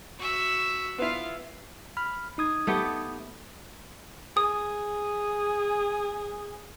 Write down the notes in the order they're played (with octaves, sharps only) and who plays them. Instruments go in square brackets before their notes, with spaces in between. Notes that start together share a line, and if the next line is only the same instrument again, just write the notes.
[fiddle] F#4 E5
[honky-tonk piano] B3 E4 [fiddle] F4 F5
[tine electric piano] B5 F6
D#4 D#6 G#6
[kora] A3 B3 G4
[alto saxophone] G#4 [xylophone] D#6